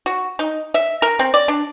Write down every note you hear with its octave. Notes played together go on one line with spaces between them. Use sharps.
F#4
D#4
E5
A#4
C4
D5
D4